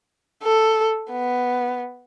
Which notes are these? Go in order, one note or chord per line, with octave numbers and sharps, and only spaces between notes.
A4
B3